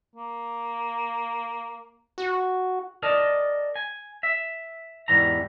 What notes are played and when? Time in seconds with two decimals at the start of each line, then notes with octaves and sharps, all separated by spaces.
0.16 A#3
2.18 F#4
3.03 A#4 D5 D#5 A5
3.76 G#5
4.23 E5
5.08 E2 G#2 E3 G3 A#5